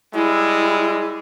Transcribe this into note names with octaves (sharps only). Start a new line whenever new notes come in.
G3 G#3 E4